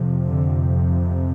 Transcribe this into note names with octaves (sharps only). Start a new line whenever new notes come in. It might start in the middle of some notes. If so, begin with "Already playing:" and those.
Already playing: F2 C3
D3